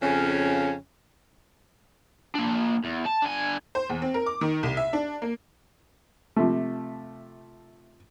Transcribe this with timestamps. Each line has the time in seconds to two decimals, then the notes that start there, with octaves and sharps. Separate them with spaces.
0.03 F2 C#3 C#4
2.35 A#3 D4
2.85 E2
3.06 A5
3.23 D3 G#5
3.75 C5
3.90 E2
4.02 C4
4.14 A#4
4.26 D6
4.41 D#3
4.63 C2
4.77 E5
4.93 D4
5.22 A#3
6.36 C3 F3 A3